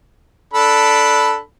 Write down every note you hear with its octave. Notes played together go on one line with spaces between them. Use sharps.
D4 A4 B5